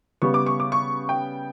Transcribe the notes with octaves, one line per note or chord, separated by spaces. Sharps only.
C#3 G3 B3 C#6
D6
C#6
D6
C#6
G5